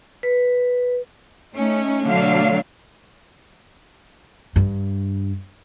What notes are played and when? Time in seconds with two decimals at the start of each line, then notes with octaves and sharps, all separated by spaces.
0.23 B4
1.52 A3 C#4 D#4
2.04 B2 D3 F#3 A3 D4 F5
4.56 G2